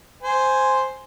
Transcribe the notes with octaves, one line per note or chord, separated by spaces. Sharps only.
C5 G#5